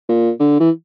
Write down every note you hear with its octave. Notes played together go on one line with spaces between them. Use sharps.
A#2
D3
E3